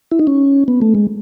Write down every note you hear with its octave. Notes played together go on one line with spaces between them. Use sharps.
E4
D#4
C#4
B3
A3
G#3